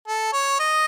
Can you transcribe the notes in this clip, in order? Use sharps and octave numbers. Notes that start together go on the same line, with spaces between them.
A4
C#5
D#5